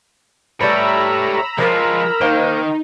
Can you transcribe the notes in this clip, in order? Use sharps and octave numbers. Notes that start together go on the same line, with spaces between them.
G3 A3 B4 C#5 E5 A#5 B5 E6
F3 G#3 F4 A#4
D#3 A#3 D#4 C5